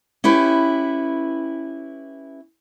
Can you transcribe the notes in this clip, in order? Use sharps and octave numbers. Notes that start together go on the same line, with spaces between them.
C#4 E4 G4 B4